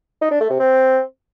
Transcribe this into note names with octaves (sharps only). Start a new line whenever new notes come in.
D#4
D4
A3
C3
C4